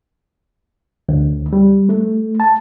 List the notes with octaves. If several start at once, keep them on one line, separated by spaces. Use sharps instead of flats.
D2
G3
A3
A5